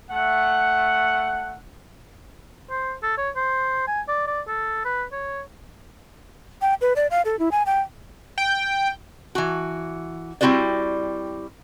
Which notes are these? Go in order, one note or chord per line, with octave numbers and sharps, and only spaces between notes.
A3 F#5
C5
A4
C#5
C5
G#5
D5
D5
A4
B4
C#5
G5
B4
D5
F5
A4
E4
G#5
G5
G5
E3 F#4
G3 C4 E4 F#4 B4 D5